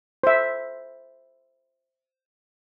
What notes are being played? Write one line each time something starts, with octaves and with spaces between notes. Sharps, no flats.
C5 E5